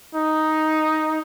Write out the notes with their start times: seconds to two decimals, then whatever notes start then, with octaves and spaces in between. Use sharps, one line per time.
0.15 D#4